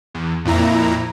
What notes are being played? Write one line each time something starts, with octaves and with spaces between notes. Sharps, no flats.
E2
F2 A#2 E4 A#5